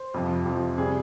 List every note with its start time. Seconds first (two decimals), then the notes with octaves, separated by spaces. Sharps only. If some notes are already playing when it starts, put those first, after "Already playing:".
Already playing: C5
0.14 F2 C3 F3
0.45 F2 C3 F3
0.78 C3 G3 G#4